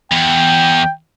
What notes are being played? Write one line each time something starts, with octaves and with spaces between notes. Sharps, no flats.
E2 G5